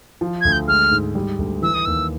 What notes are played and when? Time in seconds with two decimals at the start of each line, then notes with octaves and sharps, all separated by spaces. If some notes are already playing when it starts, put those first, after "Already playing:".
0.21 F3
0.41 D2 G#6
0.52 G6
0.68 G#3 F6
0.91 G#2
1.15 G3
1.38 D2
1.62 E3 E6
1.74 D#6
1.85 D#2 E6